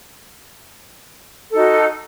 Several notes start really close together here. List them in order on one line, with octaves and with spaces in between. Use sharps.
A4 D#4 F#4